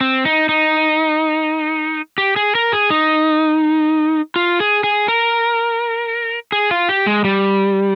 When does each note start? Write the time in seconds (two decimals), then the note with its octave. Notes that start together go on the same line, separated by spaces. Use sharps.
0.01 C4
0.25 D#4
0.49 D#4
2.18 G4
2.36 G#4
2.55 A#4
2.72 G#4
2.90 D#4
4.36 F4
4.60 G#4
4.84 G#4
5.08 A#4
6.52 G#4
6.71 F4
6.89 G4
7.06 G#3
7.25 G3